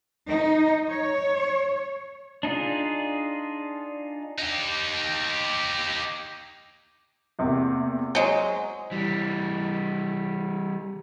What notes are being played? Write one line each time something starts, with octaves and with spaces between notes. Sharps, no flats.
D#4
C#5
D4 D#4 F4 G#4
D#4 G4
E2 C3 A#3
F#3 G#3 C5 C#5 D#5
E3 G3